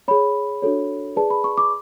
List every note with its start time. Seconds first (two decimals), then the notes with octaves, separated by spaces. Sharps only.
0.08 G#4 C#5 B5
0.62 D4 F#4 A4 C#5
1.16 G#4 B4 D5 A5
1.30 B5
1.44 C#6
1.58 D6